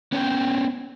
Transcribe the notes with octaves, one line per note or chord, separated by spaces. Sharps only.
B3 C#4 D4 F#4 C#5 G5